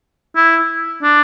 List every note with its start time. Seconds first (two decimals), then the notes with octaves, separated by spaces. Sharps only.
0.36 E4
1.03 D4